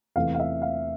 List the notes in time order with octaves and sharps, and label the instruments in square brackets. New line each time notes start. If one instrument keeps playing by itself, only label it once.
[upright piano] E2 C3 E3 A3 F5
F5
E5
F5